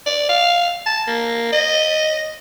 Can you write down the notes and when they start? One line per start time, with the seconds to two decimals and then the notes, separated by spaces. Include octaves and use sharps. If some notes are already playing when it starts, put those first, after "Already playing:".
0.06 D5
0.29 F5
0.86 A5
1.07 A#3
1.52 D#5